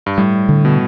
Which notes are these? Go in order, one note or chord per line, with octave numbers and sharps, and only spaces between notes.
G2
A2 G3
D3
B2